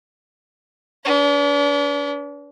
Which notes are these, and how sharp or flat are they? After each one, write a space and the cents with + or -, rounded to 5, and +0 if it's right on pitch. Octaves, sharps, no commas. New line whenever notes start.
D4 -45 B4 +0